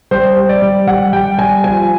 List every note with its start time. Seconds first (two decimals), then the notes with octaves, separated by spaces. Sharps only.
0.11 G3 C5
0.36 G3
0.49 D5
0.62 G3
0.87 G3 F#5
1.13 G3 G5
1.38 G3 G#5
1.64 F3 G#5